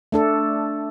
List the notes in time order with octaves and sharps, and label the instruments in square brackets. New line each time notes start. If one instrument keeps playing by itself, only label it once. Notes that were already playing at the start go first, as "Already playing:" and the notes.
[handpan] A3 D4 A4